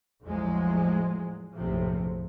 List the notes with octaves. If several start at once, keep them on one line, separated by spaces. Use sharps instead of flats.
A1 E2 A2 F3 F#3 G#3
F#1 B1 A2 C3 F3